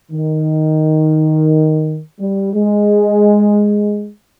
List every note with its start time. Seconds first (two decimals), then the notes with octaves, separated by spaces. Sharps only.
0.11 D#3
2.20 G3
2.54 G#3